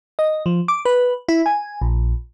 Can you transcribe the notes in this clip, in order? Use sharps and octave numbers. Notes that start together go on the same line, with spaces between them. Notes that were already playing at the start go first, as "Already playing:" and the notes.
D#5
F3
D6
B4
E4
G#5
A#1